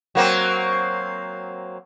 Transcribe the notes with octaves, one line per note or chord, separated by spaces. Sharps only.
F#3 A#3 C4